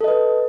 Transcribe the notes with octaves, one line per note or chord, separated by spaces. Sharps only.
A4 B4 D#5